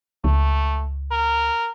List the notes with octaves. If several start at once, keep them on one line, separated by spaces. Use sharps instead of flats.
C#2 A3
A#4